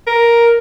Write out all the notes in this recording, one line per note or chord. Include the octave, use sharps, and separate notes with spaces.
A#4